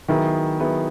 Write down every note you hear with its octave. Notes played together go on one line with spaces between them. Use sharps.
D#3 F#3 B3 E4 G#4
F#3 B3 E4 G#4